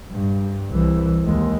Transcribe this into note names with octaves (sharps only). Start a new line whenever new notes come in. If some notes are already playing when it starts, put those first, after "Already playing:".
G2
C2 E3
D#2 G#3